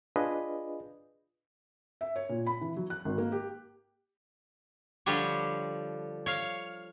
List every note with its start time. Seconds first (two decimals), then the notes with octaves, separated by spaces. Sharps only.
0.16 D4 F4 G#4 B4 D#5
2.01 E5
2.16 C#5
2.29 A#2
2.47 B5
2.61 E3
2.76 F#3
2.90 F#6
3.05 G#1
3.18 A#3
3.32 G4
5.06 D3 F3 G3 D4 G4 C#5
6.26 C#5 F5